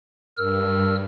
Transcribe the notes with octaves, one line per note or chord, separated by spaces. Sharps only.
G2 A#4 E6 F6